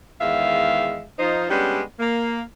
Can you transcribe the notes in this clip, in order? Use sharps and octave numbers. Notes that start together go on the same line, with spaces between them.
E2 D#3 G#3 E5 F5
F3 D#4 C5
G3 G#3 B3 C#4 D4 G4
A#3